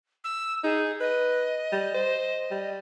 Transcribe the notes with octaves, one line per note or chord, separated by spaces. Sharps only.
E6
D#4 G#4
B4 D#5
G3
C5
G3